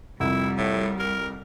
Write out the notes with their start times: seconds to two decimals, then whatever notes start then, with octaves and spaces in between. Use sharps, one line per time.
0.20 C2 F2 G3 E4
0.58 A2
0.99 A#4